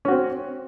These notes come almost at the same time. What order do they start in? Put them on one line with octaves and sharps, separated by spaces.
C#4 F#4 C4